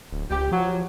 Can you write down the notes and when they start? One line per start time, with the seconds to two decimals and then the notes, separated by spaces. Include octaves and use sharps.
0.12 D1
0.30 C#2 G4
0.51 F3 F#3